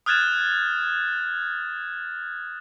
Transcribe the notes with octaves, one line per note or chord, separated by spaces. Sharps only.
D#6 F6 F#6 G#6 A6 E7